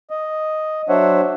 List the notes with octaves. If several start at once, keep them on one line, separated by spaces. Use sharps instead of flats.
D#5
F#3 D4 C5 C#5 E5 F#5